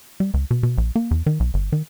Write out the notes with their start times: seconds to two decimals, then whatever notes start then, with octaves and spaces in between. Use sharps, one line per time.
0.20 G3
0.34 C#2
0.51 B2
0.63 B2
0.78 A#1
0.96 A#3
1.11 E2
1.26 D#3
1.40 B1
1.54 G1
1.72 D#3